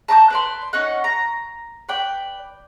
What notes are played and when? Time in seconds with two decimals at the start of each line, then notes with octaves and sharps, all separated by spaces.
0.08 A5 A#5 D6 G6
0.30 B4 D5 C6
0.73 C#4 D#4 F#5
1.04 A#5
1.89 B4 D5 G5